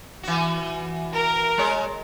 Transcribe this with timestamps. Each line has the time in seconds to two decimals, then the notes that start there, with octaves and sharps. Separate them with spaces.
0.23 E3 F#4
1.14 A#4
1.58 G#3 C#5